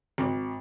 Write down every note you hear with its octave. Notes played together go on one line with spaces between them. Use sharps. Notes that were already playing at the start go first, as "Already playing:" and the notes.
G#1